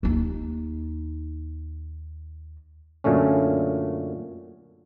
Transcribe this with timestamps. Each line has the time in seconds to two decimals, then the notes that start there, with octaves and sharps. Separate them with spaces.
0.03 D#2 D#4
3.04 F#2 A#2 D3 A3 C#4